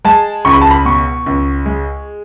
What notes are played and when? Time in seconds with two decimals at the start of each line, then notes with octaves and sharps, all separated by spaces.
0.05 G#3 A5
0.45 C#2 C#6
0.53 B5
0.61 A5
0.71 B5
0.85 B2 C#6
1.26 C#2
1.66 G#3